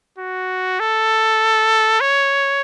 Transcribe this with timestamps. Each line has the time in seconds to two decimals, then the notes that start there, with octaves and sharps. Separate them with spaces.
0.18 F#4
0.80 A4
2.01 C#5